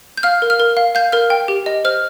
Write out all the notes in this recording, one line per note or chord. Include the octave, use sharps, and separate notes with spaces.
G6
F5 F6
A#4
F6
A#4
F5
F5 G6
A#4 F6
G5
G4
D#5
C5 F6